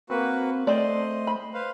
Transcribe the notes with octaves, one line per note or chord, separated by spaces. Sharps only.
A#3 C4 F#4 B4
A3 C4 C5 D5 D#5
B5
B4 C5 F5